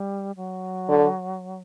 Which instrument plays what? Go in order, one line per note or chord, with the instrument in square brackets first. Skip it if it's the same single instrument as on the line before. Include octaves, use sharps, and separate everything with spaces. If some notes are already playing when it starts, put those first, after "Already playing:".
Already playing: [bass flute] G3
F#3
[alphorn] D3